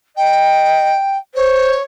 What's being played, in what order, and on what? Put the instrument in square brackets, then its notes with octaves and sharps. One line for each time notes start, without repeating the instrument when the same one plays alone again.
[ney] D#5 [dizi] G5
[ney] C5 [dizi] C#5